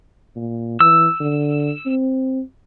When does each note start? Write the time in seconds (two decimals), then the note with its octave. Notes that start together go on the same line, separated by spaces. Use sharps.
0.36 A#2
0.80 E3 E6
1.20 D3
1.86 C4